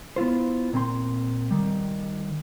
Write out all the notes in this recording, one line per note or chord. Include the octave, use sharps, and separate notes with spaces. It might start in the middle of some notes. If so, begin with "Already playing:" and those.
B3 E4 F4 C5
A#2 C4 C6
D#3 G3